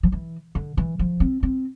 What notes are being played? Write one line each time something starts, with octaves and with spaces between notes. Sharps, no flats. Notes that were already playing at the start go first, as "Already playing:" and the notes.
F3
E3
D3
E3
F3
C4
C4